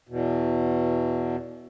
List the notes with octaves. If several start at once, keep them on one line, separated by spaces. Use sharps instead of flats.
E2 B2